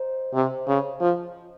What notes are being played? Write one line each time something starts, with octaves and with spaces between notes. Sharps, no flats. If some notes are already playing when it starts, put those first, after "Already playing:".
Already playing: D#4 C5
C3
C#3
F3